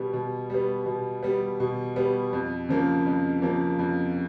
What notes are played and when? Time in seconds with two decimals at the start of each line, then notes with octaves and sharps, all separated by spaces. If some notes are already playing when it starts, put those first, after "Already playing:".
Already playing: B2 G3 B3
0.13 B2
0.50 G3 B3
0.86 B2
1.23 G3 B3
1.60 B2
1.96 G3 B3
2.33 F2
2.69 C#3 F3 A#3
3.06 F2
3.42 C#3 F3 A#3
3.79 F2